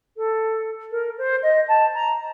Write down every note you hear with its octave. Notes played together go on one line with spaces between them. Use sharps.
A4
A#4
C5
D#5
A5
A#5